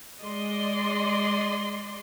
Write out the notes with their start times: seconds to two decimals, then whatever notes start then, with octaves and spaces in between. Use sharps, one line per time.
0.22 G#3 D5 D#5 C6